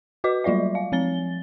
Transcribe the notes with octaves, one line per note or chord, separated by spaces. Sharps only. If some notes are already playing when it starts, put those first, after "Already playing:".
F#4 B4 D#5 D6
F#3 G3 F4 D5 E5
F5
F3 C4 A6 G7